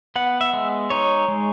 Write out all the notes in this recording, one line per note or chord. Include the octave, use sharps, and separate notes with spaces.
B3 F#5
E5
G#3
D#4 C#5
G#3